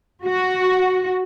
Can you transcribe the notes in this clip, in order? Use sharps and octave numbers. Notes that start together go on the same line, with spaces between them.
F#4